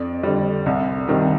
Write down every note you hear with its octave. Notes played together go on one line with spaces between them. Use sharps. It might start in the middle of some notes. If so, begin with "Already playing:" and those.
Already playing: F2 D5
D3 G3
C2
C3 D#3 G3